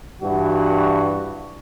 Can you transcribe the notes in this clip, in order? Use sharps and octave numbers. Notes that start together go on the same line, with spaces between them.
G2 E3 F#4